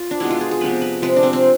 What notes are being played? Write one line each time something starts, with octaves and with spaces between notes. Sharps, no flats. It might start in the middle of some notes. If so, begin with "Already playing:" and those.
Already playing: F4
D4
B2 G#3 B3 E4
F4
G#4
G#4
C3 F3 B3 B4
B4
C3 F3 G#3 B4
D4
C4
C4